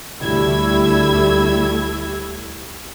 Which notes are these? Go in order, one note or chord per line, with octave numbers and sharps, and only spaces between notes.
D2 G3 A3 E4 E6 G#6